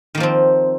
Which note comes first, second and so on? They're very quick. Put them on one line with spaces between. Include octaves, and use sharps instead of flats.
D#3 A#3 F3 C4